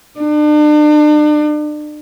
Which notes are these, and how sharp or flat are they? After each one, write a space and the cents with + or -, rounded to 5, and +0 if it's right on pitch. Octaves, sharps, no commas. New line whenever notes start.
D4 +40